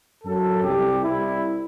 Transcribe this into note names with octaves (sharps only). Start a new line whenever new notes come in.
F#2 F#3 A4
C2 C3 G3 G4
C2 C3 G3 E4